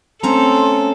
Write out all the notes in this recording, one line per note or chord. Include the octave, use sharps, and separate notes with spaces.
A3 C4 C#4 A4 A#5 C6